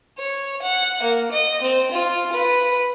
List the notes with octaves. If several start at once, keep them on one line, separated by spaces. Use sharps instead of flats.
C#5
F#5
A#3
D#5
C4
F4
B4